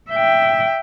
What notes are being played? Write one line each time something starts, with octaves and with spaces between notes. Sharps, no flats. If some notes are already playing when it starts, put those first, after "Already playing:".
E5 G5